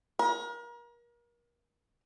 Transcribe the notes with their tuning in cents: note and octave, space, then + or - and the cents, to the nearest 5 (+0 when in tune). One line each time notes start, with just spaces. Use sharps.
A#4 +35